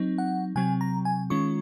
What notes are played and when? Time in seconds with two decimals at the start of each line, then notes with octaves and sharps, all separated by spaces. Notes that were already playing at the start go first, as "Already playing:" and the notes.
Already playing: F#3 C4 D#4
0.18 F#5
0.56 C3 F#3 C4 G#5
0.81 A#5
1.05 G#5
1.30 D#3 G#3 C#4 F4 C#6